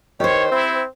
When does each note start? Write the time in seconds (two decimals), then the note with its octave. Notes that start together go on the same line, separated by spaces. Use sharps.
0.20 D#3 G4 C5 C#5
0.52 C4 E4